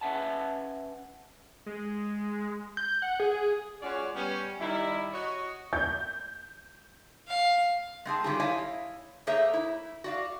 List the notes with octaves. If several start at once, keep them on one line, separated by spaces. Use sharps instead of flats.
C#4 B4 E5 F#5 A5
G#3
G6
F#5
G#4
G#3 C#4 F4 F#4 C#5 D5
G3 B3 C#4
D#3 G3 E4
F#4 C#5 D#5
G6
F5
G#3 C4 G#4 A5
G#2 D#3 G3 C#4 F4 G#4
E4 C#5 D#5 F5 G#5
A3 A#3 G#4 C5 C#5 E5
E4
F#4 D5 F5